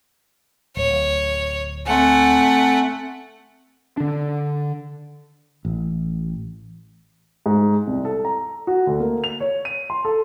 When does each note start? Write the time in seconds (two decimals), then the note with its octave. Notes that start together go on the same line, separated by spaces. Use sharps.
0.77 D1 C#5
1.86 A3 C4 F#5 G#5
3.97 D3 D4
5.65 A1
7.46 G#2
7.87 C2
8.05 A4
8.25 A#5
8.67 F#4
8.87 D2
9.00 A#3
9.24 F7
9.40 C#5
9.65 D#7
9.90 C6
10.05 A4